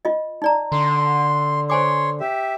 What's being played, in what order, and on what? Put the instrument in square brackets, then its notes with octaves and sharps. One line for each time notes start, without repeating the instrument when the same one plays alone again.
[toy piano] F4 D#5
D#4 D5 A#5
[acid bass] D3 [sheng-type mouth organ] C6
[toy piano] C5 G#5 D6 [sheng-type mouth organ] C#5 C6
[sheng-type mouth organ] G4 E5